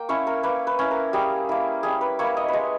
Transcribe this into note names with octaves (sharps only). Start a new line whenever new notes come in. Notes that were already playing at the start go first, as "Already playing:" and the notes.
Already playing: A#3 G5
C#4 E4 C#5
A#4
A#3 B4
B4
C#4 E4
A#4
G3 G#4
A#3 E4
G3 G#4
B4
A#3 E4 C#5
D#5
G#3 B4 C#5